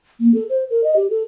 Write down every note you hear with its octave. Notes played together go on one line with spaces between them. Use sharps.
A#3
A4
C5
A#4
D#5
G4
A4